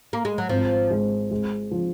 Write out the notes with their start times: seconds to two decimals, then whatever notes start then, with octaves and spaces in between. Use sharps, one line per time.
0.13 A#3
0.25 G#3
0.38 F#3
0.49 G#1 F3
0.91 G#3
1.31 G#3
1.71 F3